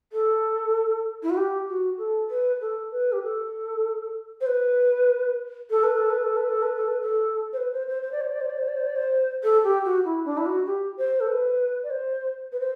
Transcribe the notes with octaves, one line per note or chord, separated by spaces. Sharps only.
A4
E4
F#4
G4
F#4
A4
B4
A4
B4
G4
A4
C5
B4
A4
B4
A4
B4
A4
B4
A4
B4
A4
B4
A4
C5
B4
C5
C5
C5
D5
C5
D5
C5
D5
C5
D5
C5
D5
C5
A4
G4
F#4
E4
D4
E4
F#4
G4
C5
A4
B4
D5
C5
B4
C5